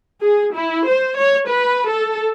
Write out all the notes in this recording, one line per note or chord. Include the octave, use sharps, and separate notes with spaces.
G#4
E4
C5
C#5
B4
A4